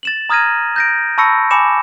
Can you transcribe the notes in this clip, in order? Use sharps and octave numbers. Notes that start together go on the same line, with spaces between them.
A6 E7 F#7
A#5 D#6 F6 G#6 A#6 D#7
G6 A#6 D7
A5 B5 C#6 E6 A#6 C#7
G#5 B5 D6 C#7 E7